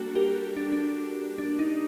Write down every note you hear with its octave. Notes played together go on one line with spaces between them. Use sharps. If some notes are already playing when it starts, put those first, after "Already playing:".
Already playing: G3 A#3 D4 F#4 A4
G4 A#4
D4
D4
D4
D#4